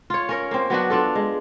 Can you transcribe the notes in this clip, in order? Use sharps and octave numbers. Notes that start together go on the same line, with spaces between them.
F4 C#5
C#4 A#4 C#5
A#3 C4
F#3 B3 D4 F#4
D4 F4 A4
G#3